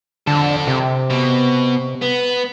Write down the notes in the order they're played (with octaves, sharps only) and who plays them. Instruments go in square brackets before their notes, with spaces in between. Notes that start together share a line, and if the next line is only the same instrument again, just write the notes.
[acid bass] D3 [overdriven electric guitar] F3 A4
[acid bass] C3
[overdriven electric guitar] B2
B3